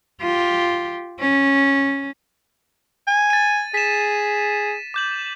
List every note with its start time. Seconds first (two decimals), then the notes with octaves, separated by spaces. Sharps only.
0.21 F4 G4
1.20 C#4
3.08 G#5
3.30 A6 D#7
3.74 G#4 B6 E7
4.94 D6 G6 F#7